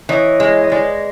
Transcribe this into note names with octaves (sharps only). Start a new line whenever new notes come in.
E3 C#5 D#5
G#3
D#5
G#3 D5